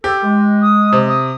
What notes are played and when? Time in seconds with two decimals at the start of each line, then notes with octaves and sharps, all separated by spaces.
0.04 G4 A4
0.23 G#3
0.61 D#6
0.93 C3
1.08 D#6